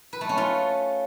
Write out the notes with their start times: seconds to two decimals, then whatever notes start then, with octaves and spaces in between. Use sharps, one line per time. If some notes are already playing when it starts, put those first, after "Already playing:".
0.13 B4
0.21 A3
0.29 C#4
0.38 F4